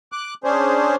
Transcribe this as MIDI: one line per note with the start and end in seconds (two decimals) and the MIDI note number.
0.12 0.34 86
0.12 0.34 90
0.44 0.96 61
0.44 0.96 62
0.44 0.96 68
0.44 0.96 72